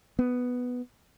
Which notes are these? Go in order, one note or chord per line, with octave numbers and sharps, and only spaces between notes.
B3